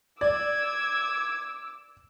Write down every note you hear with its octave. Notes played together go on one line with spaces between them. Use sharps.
D5 D6 E6 G#6